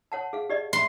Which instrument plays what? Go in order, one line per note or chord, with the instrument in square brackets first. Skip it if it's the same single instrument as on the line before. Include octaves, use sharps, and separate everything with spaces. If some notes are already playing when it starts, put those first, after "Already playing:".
[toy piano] C#5 F#5 A5
G#4 F5
G4 D5 D#5
[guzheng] C6